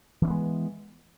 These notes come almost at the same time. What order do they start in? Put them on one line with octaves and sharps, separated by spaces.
E3 C#4 B3 G#3